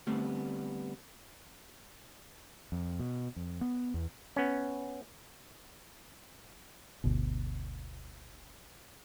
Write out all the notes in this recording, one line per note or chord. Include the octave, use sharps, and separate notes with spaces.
D3 G3 A3 B3 C4
F2
B2
F2
B3
E2
B3 C#4
G1 D2 B2